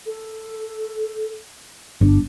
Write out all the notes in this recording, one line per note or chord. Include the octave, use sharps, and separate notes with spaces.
A4
G1 D4